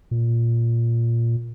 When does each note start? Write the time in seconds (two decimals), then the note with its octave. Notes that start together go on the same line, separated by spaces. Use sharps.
0.11 A#2